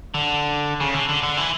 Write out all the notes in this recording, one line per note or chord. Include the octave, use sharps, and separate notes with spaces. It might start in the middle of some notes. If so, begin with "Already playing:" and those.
D3
C#3
D3
D3
D3
E3